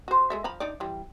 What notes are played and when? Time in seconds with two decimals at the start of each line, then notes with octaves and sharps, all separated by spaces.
0.08 F#4 C5
0.30 G#3 A4 E5
0.44 F3 A#5 B5
0.60 D4 D#4 D5
0.80 E3 G3